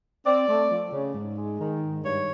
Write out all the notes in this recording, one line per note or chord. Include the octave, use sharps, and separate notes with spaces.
C4 D5
A3
F3
C#3
G#2
G#3
D#3
G#2
G2 C#5